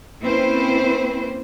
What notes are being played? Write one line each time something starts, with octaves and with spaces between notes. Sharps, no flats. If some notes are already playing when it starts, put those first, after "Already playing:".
A#3 C4 C#4 E4 B4 C5